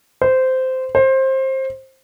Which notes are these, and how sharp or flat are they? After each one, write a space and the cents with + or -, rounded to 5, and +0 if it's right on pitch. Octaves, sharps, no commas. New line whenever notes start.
C5 -15
C5 +20